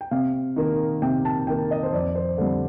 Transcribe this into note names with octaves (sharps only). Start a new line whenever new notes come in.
G5
C3 F5
D#3 A#3
C3 G5
A5
D#3 A#3 G5
D#5
C5
F2 D5
C5
D3 G3 C4 A4